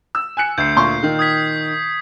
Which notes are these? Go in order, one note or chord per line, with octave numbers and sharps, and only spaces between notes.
E6
G#5 F#6 C#7
D2 G6 C7
A#2 C6 C#6
D#3
D#6 G#6 B6